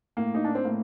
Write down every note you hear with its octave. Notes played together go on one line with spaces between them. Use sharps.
A2 A#3
D#4
D4
C4
A2 A#3